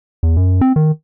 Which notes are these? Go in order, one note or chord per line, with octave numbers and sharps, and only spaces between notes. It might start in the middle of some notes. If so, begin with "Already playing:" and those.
E2
F#2
C4
D#3